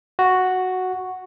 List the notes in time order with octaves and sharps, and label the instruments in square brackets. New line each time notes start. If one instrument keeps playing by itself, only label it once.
[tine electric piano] F#4